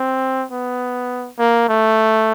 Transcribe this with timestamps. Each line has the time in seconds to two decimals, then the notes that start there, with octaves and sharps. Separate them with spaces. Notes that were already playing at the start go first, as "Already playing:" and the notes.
Already playing: C4
0.52 B3
1.39 A#3
1.68 A3